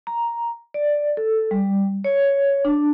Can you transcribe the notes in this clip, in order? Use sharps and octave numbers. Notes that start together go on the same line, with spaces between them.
A#5
D5
A4
G3
C#5
D4